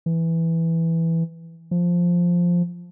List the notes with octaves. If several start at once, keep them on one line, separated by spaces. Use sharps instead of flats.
E3
F3